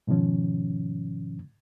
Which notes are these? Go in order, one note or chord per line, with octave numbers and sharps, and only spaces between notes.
G#2 B2 D#3 F3 C#4